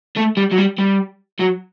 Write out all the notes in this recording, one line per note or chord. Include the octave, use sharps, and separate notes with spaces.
A3
G3
F#3
G3
G3
F#3